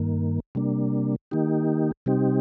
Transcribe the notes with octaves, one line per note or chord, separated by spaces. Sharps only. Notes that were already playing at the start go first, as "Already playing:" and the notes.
Already playing: G2 D#3 A#3
C3 G3 A#3 D4
D#3 A#3 D#4 G4
C3 G3 C4 D#4 G4